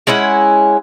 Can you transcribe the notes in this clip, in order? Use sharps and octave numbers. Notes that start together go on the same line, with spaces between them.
G#3 C#4 E4 F#5